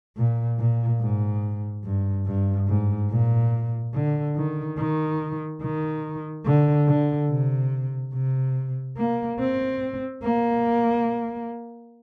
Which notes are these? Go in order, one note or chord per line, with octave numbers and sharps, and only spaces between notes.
A#2
A#2
G#2
G2
G2
G#2
A#2
D3
D#3
D#3
D#3
D3
D3
C3
C3
A#3
C4
A#3